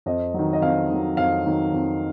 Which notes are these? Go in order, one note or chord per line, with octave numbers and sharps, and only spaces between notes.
F2 D#5
D#3 F#3
D#5
F2 F5
D#3 F#3
F2 F5
D#3 F#3
F2